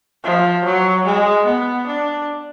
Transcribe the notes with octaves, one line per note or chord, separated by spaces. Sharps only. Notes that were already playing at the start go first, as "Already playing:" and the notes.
F3
F#3
G#3
B3
D4